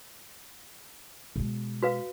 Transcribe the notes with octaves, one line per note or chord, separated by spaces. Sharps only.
B2 G#3
F#4 B4 F5